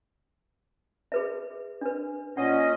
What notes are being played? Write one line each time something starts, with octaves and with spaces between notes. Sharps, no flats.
G#4 B4 E5
D4 B4
A#2 C#4 D#5 F#5